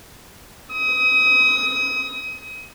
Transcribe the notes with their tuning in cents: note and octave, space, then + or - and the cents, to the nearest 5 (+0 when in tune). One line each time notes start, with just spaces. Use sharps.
D#6 +30